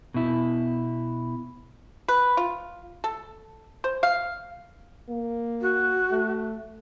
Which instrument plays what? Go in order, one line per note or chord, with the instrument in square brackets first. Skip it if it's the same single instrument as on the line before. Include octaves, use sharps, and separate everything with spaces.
[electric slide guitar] B2 E4
[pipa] B4
F4
A4
C5
F5
[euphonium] A#3
[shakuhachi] F#4
[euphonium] A3